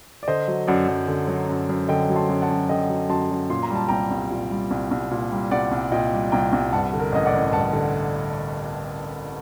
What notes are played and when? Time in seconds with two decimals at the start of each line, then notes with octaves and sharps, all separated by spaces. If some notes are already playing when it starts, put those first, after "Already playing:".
0.23 D5
0.28 D3 C5 D#5
0.48 F#3
0.67 F#2 D5 F#5
0.88 F#2
1.08 D3
1.28 F#3
1.49 F#2
1.69 F#2
1.88 D3 D#5 G5
2.10 F#3
2.16 A5 C6
2.29 F#2
2.42 F#5 A5
2.49 F#2
2.69 D3 D#5 G5
2.89 F#3
3.09 F#2 A5 C6
3.30 F#2
3.50 A#2 C6
3.63 A#5
3.70 G3
3.76 A5
3.88 C2 G5 A#5
4.11 C2
4.31 A#2
4.51 G3
4.71 C2
4.91 C2
5.11 A#2
5.32 G3
5.51 C2 D5 F#5
5.71 C2
5.92 A#2 D#5 G5
6.12 G3
6.32 C2 G5 A#5
6.53 C2
6.73 G2 F#5 A5
6.93 D3
6.99 A#4
7.12 A1 D#5
7.26 D5 F#5
7.33 A1
7.53 G2 F#5 A5
7.73 D3